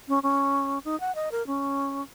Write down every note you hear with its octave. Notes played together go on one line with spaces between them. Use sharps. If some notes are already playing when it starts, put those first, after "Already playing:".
C#4
C#4
D#4
F#5
D#5
A#4
C#4